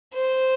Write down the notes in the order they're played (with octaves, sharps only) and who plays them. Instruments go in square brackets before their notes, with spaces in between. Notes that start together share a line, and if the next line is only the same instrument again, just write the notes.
[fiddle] C5